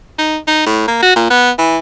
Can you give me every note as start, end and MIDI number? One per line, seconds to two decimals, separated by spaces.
0.18 0.37 63
0.47 0.66 63
0.66 0.84 45
0.88 1.01 58
1.02 1.14 66
1.16 1.26 46
1.30 1.51 59
1.59 1.78 52